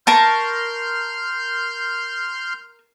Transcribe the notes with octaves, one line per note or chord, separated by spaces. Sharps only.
A#4 A5 C6 C#6 F6 G6